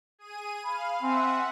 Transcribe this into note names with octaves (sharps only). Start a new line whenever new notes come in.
G#4 D#7
F5 B5
C4 E5 F#5 G#5